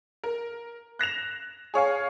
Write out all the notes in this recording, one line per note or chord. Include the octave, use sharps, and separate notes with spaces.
A#4
F#6 A#6 E7 F7
G#4 C#5 F5 G#5